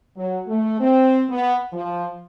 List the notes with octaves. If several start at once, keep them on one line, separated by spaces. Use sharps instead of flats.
F#3
A3
C4
B3
F3